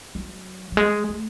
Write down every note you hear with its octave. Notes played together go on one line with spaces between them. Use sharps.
F#3
F#3
G#3
A3